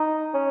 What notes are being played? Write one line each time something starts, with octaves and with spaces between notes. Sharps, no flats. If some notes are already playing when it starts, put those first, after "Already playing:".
Already playing: D#4
C#4